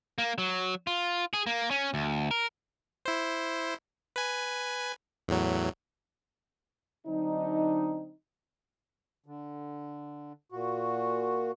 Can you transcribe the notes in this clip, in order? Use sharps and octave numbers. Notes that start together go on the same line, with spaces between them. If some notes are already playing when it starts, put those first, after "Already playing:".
A#3
F#3
F4
G#4
A#3
C#4
D2
A#4
E4 C5
B4 G#5
E2 A2 F#3
D3 F#3 C4 D4 D#4
D3
A#2 F#4